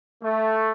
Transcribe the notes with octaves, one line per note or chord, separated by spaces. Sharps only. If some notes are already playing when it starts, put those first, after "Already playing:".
A3